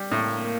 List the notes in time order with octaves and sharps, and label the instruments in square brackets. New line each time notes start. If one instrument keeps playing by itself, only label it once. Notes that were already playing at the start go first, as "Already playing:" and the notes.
Already playing: [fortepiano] G3
[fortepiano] A2 [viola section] A#3